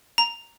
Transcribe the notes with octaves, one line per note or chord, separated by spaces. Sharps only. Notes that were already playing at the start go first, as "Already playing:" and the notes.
A#5